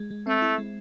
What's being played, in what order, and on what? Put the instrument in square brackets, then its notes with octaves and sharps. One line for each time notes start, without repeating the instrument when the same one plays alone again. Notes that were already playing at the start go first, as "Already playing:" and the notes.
Already playing: [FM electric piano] G#3
G#3
[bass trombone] A3 [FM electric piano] C4
[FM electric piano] E4
G#3